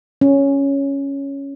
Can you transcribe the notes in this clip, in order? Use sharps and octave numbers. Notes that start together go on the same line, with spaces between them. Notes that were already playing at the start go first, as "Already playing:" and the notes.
C#4